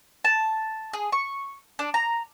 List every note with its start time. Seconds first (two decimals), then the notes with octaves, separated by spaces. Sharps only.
0.25 A5
0.93 G#4
1.12 C#6
1.79 D4
1.94 A#5